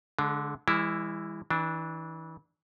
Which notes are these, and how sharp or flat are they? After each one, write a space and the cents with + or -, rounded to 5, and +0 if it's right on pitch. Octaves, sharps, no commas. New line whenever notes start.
D3 -15 G#3 +30 D4 +25
E3 +0 G#3 -40 E4 +0
E3 -30 D4 +0